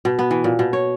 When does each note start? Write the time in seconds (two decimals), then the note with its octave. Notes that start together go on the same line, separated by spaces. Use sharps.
0.05 B2
0.19 B3
0.31 E3
0.44 A#2
0.59 B2
0.73 C#5